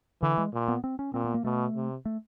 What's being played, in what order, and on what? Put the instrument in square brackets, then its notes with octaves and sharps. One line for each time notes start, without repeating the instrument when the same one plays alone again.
[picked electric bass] D3 [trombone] E3
[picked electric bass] G#3
[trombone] A#2
[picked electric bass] B3
C4
C#4
[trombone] A#2 [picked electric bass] C4
[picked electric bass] B3
A#3
[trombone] B2 [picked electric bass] A3
[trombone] C3
[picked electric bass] A3